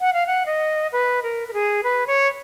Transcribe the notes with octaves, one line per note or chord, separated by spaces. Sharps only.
F#5
F5
F#5
D#5
B4
A#4
A#4
G#4
B4
C#5